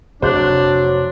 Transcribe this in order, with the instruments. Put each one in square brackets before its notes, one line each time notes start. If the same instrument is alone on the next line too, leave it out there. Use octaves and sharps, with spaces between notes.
[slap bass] F1 [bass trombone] F#3 [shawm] D4 [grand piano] C5 F#6